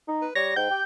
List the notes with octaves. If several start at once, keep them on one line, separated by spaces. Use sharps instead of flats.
D#4
B4
G3 C#5 A#6
G#2 G5 G6
G4